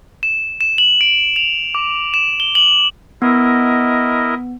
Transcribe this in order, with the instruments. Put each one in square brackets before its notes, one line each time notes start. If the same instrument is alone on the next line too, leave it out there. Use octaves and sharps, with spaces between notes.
[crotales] E7
E7
F#7
D7
F7
D6
E7
G7
F#7
[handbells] B3 [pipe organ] E4 A#4 D#5